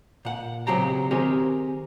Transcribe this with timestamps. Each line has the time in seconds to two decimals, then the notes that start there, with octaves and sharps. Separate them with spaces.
0.25 A#2 F#5
0.67 B1 C#3 F#3 C4 G4 A#5
1.11 D#3 C4 G4 G#4 A#4 C#5